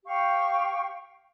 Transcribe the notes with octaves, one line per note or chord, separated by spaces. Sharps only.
G4 F5 G5 C#6